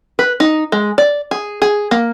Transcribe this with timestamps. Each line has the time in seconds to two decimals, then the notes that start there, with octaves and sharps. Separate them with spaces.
0.19 B4
0.40 D#4
0.72 G#3
0.98 D5
1.31 G#4
1.62 G#4
1.91 A#3